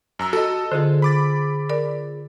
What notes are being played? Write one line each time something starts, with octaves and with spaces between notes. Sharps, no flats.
F#2 A#5 E6
F#4 A4 D#5
D3 F4 G#4 C5
B5 D6 A6
A#4 D5